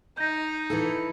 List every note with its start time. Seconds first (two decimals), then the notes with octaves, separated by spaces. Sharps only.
0.17 D#4 G6 A#6
0.70 E3 E4 A4